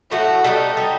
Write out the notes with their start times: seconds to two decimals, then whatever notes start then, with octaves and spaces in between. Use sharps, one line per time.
0.11 A2 F#3 A3 F#4
0.44 G3 B3 D#4 F#4 A4
0.77 G3 B3 D#4 F#4